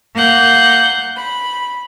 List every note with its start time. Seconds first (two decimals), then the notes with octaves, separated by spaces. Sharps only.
0.15 A#3 F#5 G6
1.16 B5